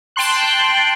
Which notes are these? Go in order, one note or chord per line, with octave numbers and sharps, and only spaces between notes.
G5 A5 C6 F#6